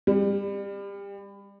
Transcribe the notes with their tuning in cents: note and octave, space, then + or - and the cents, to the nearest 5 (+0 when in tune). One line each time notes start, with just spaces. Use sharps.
G3 +30